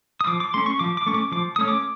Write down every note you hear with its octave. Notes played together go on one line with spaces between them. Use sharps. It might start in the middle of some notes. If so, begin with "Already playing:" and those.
D#6
F3 D6
D6
A3 C#4 C6
C#6
F3 D6
D6
A3 C#4 C#6
D6
F3 D6
A3 C#4 D#6
D6